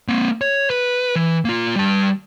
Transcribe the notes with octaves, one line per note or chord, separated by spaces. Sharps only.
A#3 C4
C#5
B4
E3
A#3 F4
G3 A5